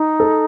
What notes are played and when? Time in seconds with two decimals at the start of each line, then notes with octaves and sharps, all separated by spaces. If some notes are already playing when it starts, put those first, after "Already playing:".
Already playing: D#4
0.20 A4